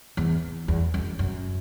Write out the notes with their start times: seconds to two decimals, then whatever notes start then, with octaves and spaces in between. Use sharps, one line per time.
0.17 E2
0.68 E2
0.94 F#2
1.19 F#2